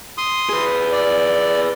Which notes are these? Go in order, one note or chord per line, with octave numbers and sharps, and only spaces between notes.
C6 D#6
G#4 B4
D5